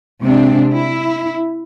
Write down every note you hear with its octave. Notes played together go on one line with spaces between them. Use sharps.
C3 G#3 C4 D4
E4